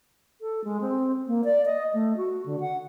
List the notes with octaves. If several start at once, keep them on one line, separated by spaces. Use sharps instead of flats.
A4
G#3
C4
A#3
D5
D#5
A3
F#4
D3
F#5